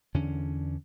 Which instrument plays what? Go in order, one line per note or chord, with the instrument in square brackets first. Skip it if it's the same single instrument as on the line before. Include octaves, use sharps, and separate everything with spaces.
[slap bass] E2 D3 C#4 D4